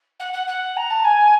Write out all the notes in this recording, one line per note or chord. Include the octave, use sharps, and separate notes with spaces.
F#5
F#5
F#5
A#5
A5
G#5